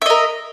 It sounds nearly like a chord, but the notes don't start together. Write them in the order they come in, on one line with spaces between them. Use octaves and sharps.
E5 D#5 A#4